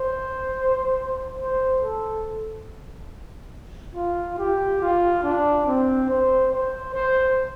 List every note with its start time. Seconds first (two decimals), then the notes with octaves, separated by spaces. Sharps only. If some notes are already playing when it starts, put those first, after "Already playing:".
Already playing: C5
1.39 C5
1.82 A4
3.95 F4
4.39 G4
4.81 F4
5.24 D4
5.66 C4
6.09 C5
6.52 C5
6.95 C5